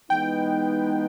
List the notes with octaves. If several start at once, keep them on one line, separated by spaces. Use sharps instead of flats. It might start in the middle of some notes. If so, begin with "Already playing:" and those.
E3 G#3 B3 D#4 G5